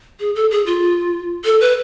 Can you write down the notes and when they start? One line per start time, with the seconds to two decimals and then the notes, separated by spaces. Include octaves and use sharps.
0.20 G#4
0.35 A4
0.51 G#4
0.66 F4
1.45 A4
1.61 B4